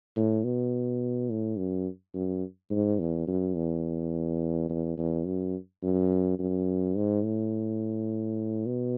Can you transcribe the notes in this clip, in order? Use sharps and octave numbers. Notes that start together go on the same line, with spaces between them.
A2
B2
A2
F#2
F#2
G#2
E2
F#2
E2
E2
E2
F#2
F#2
F#2
G#2
A2
B2